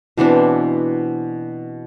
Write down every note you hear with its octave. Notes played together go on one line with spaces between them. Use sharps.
B2 E3 C4 D4